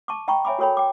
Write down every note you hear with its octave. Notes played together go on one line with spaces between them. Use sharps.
A5 C#6 D6
D#5 G5 A#5 B5 C#6
C#5 E5 G#5 B5 D6
F#4 A4 A#4 C#5 G5 B5
G5 D6